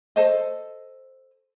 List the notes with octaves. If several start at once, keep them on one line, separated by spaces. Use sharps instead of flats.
A4 C5 D#5